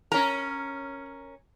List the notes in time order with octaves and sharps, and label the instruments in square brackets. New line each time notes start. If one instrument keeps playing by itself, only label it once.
[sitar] C#4 A#4 [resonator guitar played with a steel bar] A#5